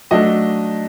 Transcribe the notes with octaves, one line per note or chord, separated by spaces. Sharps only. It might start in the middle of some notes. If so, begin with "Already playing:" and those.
F#3 A3 D4 D#5